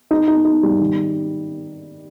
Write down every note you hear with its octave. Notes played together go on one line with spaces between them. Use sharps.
D#4
D#4
D#4
G3
D#3